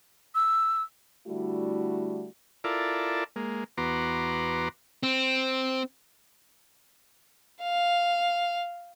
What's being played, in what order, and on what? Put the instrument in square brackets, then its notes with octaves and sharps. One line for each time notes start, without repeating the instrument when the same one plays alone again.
[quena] E6
[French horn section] D3 G3 A3 E4 F#4
[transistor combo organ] E4 F4 A4 A#4 D5
G#3 A#3
E2 B3 F#4 A#5 C6 D6
[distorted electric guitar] C4
[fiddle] F5